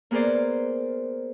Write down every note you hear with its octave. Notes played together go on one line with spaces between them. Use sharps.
A#3 B3 G#4 A#4 C5 D5